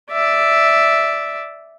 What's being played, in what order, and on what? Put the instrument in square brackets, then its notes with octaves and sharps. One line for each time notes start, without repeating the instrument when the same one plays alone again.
[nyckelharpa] D5 E5